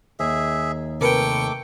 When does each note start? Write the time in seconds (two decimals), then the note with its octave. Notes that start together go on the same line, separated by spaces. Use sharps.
0.20 D#2 G#4 E5
1.01 C3 A3 A#4 B4 G5 D6 C#7